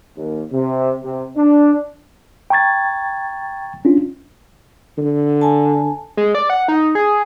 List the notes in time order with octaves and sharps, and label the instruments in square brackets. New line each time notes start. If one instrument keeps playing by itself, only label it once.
[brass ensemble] D#2
C3
C3
D4
[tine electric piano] G5 A#5 C#6 G#6 A6
C#4 D4 F4
[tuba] D3
[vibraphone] G#5 A5
[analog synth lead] G#3
D5
F#5
D#4
G#4